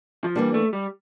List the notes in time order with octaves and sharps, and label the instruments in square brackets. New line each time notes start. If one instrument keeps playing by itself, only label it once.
[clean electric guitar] F3
[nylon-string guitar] E3 A#3 D4 [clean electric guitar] G3
[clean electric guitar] A3
G3